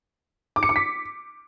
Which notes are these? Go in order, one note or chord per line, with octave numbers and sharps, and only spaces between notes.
D6
C#7
D6
B6